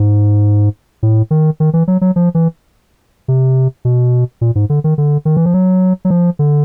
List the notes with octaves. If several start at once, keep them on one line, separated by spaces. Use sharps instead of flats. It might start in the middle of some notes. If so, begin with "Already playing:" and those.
Already playing: G#2
A2
D#3
D#3
E3
F#3
F#3
F3
E3
C3
B2
A#2
G#2
D3
D#3
D3
D#3
E3
F3
F#3
F#3
F3
D3